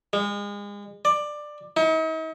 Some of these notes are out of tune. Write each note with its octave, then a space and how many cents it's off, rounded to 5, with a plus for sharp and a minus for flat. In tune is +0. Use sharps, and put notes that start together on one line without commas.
G#3 -35
D5 +15
D#4 +45